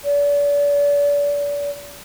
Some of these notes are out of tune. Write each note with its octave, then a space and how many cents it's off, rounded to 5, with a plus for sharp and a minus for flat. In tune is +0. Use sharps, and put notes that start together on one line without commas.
D5 -35